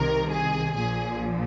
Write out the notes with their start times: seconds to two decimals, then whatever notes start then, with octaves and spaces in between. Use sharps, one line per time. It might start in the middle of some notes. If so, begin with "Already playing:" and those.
Already playing: C2 C3 D#3 A#4
0.30 G#4
0.76 A#1 A#2 F3 G#4